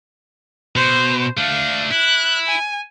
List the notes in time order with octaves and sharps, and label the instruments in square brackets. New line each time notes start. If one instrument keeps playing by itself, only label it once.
[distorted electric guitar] B2 [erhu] C5
[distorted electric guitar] A3 D4 [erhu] F5
[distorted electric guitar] E4 [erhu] F#6
[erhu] G#5